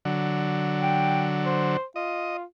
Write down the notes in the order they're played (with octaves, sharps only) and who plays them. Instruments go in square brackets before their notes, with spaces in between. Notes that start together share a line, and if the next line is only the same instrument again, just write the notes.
[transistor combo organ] D3 F#3
[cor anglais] G5
C5
[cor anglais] F4 [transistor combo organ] D#5